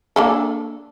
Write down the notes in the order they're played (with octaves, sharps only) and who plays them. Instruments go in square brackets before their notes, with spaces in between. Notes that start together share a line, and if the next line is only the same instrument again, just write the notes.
[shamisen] A#3 D4 A4